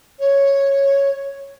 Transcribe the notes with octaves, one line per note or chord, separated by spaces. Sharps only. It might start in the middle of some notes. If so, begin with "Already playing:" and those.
C#5